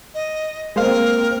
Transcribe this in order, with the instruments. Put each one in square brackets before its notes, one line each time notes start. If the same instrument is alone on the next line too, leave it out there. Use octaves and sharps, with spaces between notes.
[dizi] D#5
[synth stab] G#3 C5 F5 [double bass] A#3 C4 [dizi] A#4